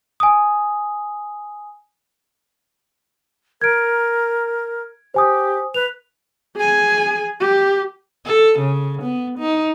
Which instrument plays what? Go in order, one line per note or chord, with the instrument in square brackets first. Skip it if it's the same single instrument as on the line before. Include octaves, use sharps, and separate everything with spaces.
[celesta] G#5 D#6
[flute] A#4 [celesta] G#6 D7
[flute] G4 [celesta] C5 G#5 D#6
[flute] B4 [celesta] F7
[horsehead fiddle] G#4 G#5
G4
[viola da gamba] A4
C#3
B3
D#4